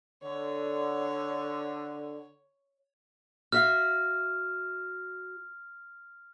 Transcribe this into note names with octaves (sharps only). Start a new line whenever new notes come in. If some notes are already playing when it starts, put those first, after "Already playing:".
D3 C#5
F#4 E5 F5 F6